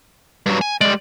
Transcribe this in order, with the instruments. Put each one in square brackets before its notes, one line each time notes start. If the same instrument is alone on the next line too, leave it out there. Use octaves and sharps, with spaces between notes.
[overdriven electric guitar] G2 F#3
G#5
[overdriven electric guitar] G3 G#3 [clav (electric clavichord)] D5